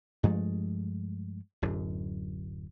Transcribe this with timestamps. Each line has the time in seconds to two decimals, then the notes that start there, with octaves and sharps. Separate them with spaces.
0.23 G2 F3 G#3 A3
1.62 D1 F#2